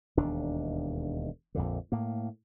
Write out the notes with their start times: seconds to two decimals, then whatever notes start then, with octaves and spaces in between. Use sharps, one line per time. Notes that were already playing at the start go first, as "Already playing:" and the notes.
0.17 E1 D#2 D4
1.55 A#1 F2 D3
1.92 A2 A#3